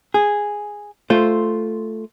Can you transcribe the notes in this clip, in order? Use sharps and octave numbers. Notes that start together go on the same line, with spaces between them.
G#4
A3 F4 C5